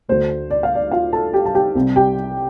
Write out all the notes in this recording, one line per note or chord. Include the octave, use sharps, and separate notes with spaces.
D2 D3 A3 C5
D5
F5
D5
F4 F5
A4 A5
G4 G5
A5
G4 G5
C2 C3 G3 C4
G4 G5